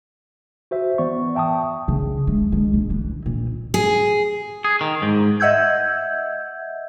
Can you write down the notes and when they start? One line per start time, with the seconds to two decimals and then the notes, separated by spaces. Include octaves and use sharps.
0.71 F#4 C5 E5
0.98 E3 B3 D5 C#6
1.35 E5 G5 A5 C#6 D#6
1.88 C#3
2.27 G#3
2.52 G#3
2.73 A#1
2.90 E3
3.26 A#2
3.74 G#4
4.65 G#4
4.81 D#3
5.02 G#2
5.40 D#5 E5 F#5 E6 G6 G#6